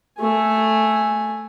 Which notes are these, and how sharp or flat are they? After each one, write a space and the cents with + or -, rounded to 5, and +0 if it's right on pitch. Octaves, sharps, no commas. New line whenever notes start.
A3 +0 G#5 +0